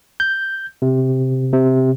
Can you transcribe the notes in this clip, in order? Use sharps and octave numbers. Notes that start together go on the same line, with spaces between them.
G6
C3
C3